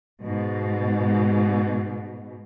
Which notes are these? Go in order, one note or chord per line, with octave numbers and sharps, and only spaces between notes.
G#2 B2